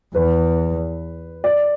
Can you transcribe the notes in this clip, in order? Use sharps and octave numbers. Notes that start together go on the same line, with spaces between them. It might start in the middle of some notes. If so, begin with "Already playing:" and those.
E2 B4
D5